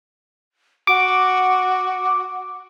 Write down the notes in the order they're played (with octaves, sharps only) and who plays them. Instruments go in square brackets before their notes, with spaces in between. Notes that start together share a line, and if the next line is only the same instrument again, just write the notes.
[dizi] F#4 [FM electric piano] D6